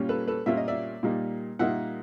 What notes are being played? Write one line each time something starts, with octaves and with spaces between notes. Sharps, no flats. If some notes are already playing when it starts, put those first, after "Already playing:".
Already playing: A#2 G3 A#3 C#4 F4
A4 B4
A4 B4
A#2 G3 A#3 C#4 F4 E5
D#5
D5 E5
A#2 G3 A#3 D#4
A#2 G3 A#3 D#4 E5 F#5